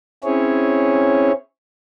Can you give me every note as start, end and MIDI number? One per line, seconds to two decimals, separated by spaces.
0.24 1.32 60
0.24 1.32 61
0.24 1.32 64
0.24 1.32 68
0.24 1.32 73